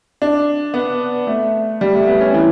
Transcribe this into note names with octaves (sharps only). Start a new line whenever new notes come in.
D4
B3
A3
G3
A3
B3
C#4
E3